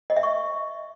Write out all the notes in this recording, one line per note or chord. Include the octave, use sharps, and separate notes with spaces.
D#5
E5
C#6